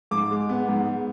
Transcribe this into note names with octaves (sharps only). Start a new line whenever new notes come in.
G#2 D6
G#3
B3
G#2